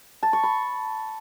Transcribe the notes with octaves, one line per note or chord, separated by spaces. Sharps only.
A5
C#6
B5